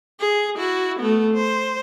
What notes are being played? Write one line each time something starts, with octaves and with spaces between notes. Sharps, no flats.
G#4
E4 F#4
A3 B3
C5